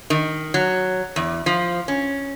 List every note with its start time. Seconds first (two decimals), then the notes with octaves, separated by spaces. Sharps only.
0.10 D#3
0.54 F#3
1.16 E2
1.46 F3
1.88 C#4